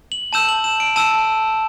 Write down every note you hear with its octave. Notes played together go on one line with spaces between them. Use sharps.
F#7
A5 E6 G6 E7
F#7
E7
D7
A5 E6 G6 E7